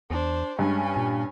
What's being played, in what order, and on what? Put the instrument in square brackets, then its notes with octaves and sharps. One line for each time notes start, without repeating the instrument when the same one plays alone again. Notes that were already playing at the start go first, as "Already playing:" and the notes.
[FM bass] E2 [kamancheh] D4 C5
[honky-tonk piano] G2 [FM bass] G#3 [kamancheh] C#4 G#5
[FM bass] A#2